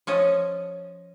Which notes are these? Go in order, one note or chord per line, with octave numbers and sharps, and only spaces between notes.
F3 C#4 A4 D#5